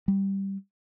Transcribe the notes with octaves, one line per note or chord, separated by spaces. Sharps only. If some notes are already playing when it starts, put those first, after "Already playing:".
G3